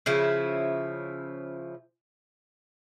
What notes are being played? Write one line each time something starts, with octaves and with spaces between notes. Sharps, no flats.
C#3 F3 E4